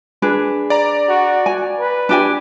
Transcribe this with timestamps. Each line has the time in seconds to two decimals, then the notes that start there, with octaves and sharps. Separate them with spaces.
0.22 D4 G#4 B4
0.70 D5 A#5
1.09 F#4
1.46 G#5
1.79 B4
2.09 D4 G4 G#5